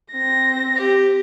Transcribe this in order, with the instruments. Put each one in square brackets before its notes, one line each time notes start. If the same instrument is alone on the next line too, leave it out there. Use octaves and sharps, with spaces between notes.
[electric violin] C4 A#6
[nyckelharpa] G4